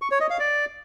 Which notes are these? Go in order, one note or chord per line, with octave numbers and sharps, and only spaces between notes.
C#6
C#5
D#5
F5
D5